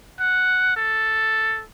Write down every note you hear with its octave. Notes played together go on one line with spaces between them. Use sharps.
F#5
A4